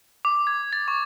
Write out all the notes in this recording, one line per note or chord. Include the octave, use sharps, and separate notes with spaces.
D6
G#6
A6
C#6